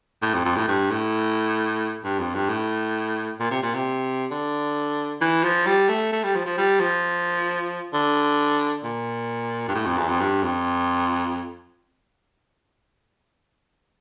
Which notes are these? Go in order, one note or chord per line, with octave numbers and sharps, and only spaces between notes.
A2
F2
F2
A2
G2
A2
G2
F2
G2
A2
A#2
C3
A#2
C3
D3
E3
F3
G3
A3
A3
G3
F3
F3
G3
F3
D3
A#2
G2
A2
F2
E2
F2
G2
F2